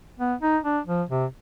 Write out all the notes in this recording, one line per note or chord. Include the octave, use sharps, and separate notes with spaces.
B3
D#4
D4
F3
C3